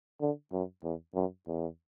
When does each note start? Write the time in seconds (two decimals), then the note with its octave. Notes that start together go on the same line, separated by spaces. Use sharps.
0.22 D3
0.53 F#2
0.84 E2
1.15 F#2
1.47 E2